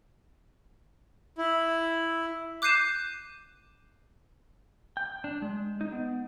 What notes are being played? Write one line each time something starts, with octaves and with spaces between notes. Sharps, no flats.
E4
D6 F#6 G6 C7 D#7 E7
G5
D4
G#3
D#4
B3